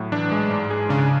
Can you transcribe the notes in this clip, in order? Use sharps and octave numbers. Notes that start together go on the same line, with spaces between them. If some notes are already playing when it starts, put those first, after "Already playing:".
Already playing: A2 F#3
E3 D4
G#3
G#2
G#4
C#3 D4